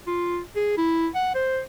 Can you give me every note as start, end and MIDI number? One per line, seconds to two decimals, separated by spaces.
0.07 0.40 65
0.56 0.75 68
0.77 1.08 64
1.15 1.33 78
1.35 1.61 72